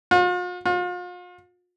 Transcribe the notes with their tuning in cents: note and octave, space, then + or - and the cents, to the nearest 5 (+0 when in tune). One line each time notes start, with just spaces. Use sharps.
F4 +45
F4 +40